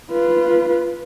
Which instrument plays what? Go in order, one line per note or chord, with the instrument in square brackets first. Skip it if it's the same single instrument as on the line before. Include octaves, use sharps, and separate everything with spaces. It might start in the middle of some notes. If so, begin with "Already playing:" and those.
[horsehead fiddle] F4 B4